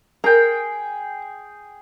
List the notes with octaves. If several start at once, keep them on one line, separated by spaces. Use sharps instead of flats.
G#4 A#4 G5